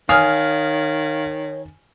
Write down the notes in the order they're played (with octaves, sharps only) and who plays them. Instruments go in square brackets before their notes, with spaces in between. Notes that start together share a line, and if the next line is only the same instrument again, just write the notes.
[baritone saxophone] D#3 [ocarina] C#5 [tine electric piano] F5 [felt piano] G#5 D#6 F6